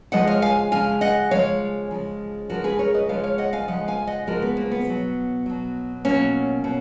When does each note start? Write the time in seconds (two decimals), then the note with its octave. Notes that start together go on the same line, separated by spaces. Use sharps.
0.12 C#3 F3 G#3 D#5 F#5
0.27 C#5 F5
0.42 F5 G#5
0.72 C#3 F3 G#3 F5 G#5
1.01 D#5 F#5
1.31 C#3 F3 G#3 C#5 F5
1.91 C#3 F3 G#3
2.49 C#3 F3 G#3 F#4 A#4
2.64 G#4 B4
2.79 A#4 C#5
2.94 B4 D#5
3.08 C#3 F3 G#3 C#5 F5
3.23 C#5 F5
3.38 D#5 F#5
3.53 F5 G#5
3.68 C#3 F3 G#3 D#5 F#5
3.88 F5 G#5
4.07 D#5 F#5
4.27 C#3 F3 G#3 F#4 A#4
4.42 B3
4.57 A#3
4.71 B3
4.87 B2 F#3
5.46 B2 F#3
6.05 B2 F#3 A#3 C#4
6.64 B2